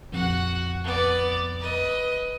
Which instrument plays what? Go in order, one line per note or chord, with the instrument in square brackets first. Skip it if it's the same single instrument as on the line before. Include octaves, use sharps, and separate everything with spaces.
[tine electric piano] A#1 F2 [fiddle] F#4 F#5
[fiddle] B3 D5
B4 D#5